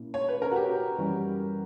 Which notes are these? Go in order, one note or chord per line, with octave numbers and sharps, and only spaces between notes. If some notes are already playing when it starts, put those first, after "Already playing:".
Already playing: A#2 A#3 C#4 E4
C#5
B4
A#4
F#4
G4
F#2 E3 G3 C#4